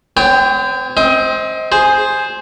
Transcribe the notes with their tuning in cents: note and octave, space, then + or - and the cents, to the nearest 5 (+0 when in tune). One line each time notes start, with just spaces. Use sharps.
C4 -45 C#5 +0 G5 +10
C4 +0 D#5 +30
G#4 +0 C5 +0